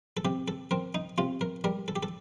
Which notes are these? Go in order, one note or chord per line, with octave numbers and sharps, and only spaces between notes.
A4
C3 G4
A4
C4 A#4
D#4
C3 F4
A#4
G3 A#4
A4
G4
A4